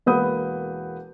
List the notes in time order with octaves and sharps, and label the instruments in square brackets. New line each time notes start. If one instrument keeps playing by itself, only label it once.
[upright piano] E1 A#3 B4 F#5 D#6 G6